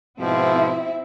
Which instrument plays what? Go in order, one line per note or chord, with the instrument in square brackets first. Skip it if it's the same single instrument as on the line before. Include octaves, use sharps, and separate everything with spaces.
[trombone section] G#2 B2 F3 [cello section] C4 E4